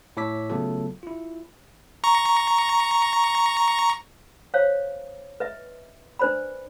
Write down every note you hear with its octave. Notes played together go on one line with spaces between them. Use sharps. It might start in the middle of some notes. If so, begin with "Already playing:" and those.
A2 E4 C#5 D6 E6 B6
C#3 F#3 A3 B3 F4 A4
E4 F4
A#5 C#6
C5 C#5 F5
B4 D#5 E5
D4 B4 C5 D5 B5